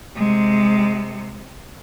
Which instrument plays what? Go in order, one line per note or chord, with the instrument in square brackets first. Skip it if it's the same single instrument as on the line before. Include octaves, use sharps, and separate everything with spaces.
[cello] C3 G#3